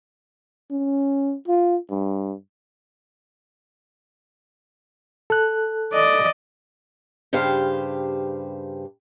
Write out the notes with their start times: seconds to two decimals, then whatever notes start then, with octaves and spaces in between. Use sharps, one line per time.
0.71 C#4
1.48 F4
1.90 G2
5.30 A4 F#6
5.93 D5 D#5
7.33 G2 C#3 G4 C5 F5